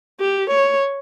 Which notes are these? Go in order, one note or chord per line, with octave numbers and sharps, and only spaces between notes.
G4
C#5